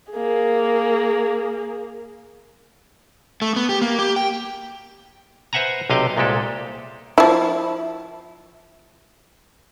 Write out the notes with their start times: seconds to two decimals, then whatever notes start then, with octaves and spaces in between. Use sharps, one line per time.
0.12 A#3 G#4
3.42 A3
3.56 B3
3.69 G4
3.81 A#3
3.99 G4
4.16 G5
5.53 B4 C5 E5 F#5 G#5 A#5
5.90 B1 C3 G4 D#5 F5 G5
6.17 C2 A#2 G#3 G4 A4
7.18 F3 E4